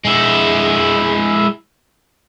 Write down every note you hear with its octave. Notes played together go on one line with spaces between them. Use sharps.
G#3 E4